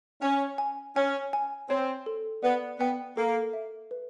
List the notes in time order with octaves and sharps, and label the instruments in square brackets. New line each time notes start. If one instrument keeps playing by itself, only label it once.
[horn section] C#4 [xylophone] G#5
[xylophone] G#5
[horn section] C#4 [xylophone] G#5
[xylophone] G#5
[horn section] C4 [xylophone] C#5
[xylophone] A4
[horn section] B3 [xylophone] D5
[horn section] B3 [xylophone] G5
[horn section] A#3 [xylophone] A4
[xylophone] E5
B4